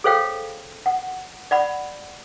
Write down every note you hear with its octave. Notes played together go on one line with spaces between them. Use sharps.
G#4 A4 C5 C#5 F5 G5
F#5
D5 F#5 B5